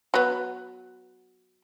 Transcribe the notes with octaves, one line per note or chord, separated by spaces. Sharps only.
F#3 B3